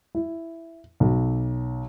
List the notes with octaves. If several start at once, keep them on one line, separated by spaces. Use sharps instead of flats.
E4
B1